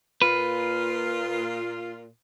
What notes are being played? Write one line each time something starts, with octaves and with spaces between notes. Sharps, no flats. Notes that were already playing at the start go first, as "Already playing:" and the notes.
A#2 F4 B4